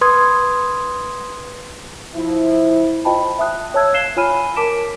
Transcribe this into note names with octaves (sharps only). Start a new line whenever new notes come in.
B4 C6 D#6 G#6
F3 E4
F4 C5 D#5 G5 A5 B5
E5 A5 D#6 F#6
C#5 E5 A5 E6 G#6
F5 F#6 C7 E7 G7
F4 C#5 G#5 B5 F6 D#7
A#4 A5 D6 B6 D7 E7